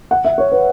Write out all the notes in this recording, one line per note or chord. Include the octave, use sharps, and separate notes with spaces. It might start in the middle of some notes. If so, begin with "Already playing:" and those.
F#5
E5
C#5
B4